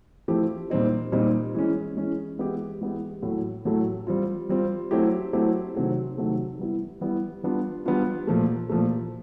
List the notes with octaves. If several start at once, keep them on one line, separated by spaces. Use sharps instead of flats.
F3 A3 C4 E4 G4
A#2 G3 C4 D#4
A#2 G3 C4 D#4
E3 G#3 C#4
E3 G#3 C#4
E3 G#3 B3 E4 G4
E3 G#3 B3 E4 G4
A2 F#3 A3
A2 F#3 A3
G3 C4 F4
G3 C4 F4
F#3 A3 C4 E4 G4
F#3 A3 C4 E4 G4
C3 D#3 F#3 A3 C4
C3 D#3 F#3 A3 C4
G3 B3 E4
G3 B3 E4
G3 B3 D4 F4
G3 B3 D4 F4
A#2 F3 A3
A#2 F3 A3